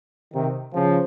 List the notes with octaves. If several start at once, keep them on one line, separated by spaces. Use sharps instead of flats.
C3 D#3
C#3 F3